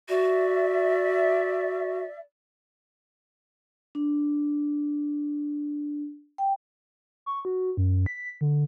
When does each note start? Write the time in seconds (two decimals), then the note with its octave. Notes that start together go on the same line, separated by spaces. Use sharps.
0.09 F#4 D5 E5
3.95 D4
6.38 G5
7.26 C#6
7.45 F#4
7.77 F#2
8.06 B6
8.41 D3